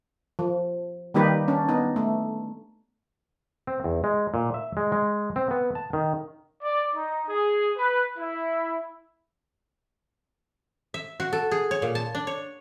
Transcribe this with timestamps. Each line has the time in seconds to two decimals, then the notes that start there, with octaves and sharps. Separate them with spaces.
0.39 F3
1.14 D#3 G3 A#3 D#4 G4 B4
1.48 C#4 D4
1.69 B3 D#4
1.96 A3
3.67 C4
3.84 E2
4.04 G#3
4.34 A#2
4.54 E5
4.77 G#3
4.92 G#3
5.36 C4
5.51 B3
5.75 A5
5.93 D#3
6.63 D5
6.95 D#4
7.28 G#4
7.77 B4
8.18 E4
10.94 E5
11.20 F#4
11.33 A4
11.51 G#4
11.71 C#5
11.82 A#2
11.95 A5
12.15 D4
12.27 C#5